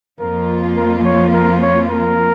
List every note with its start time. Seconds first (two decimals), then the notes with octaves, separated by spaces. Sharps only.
0.20 F2 F3 A#3 F4 A#4
0.77 A#4
1.05 C#5
1.33 A#4
1.62 C#5
1.91 A#4